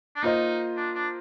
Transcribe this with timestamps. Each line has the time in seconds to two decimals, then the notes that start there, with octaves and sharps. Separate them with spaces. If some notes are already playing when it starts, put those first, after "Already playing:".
0.16 D4
0.23 A#3 D#4 F4 C5 D#5
0.77 D4
0.95 D4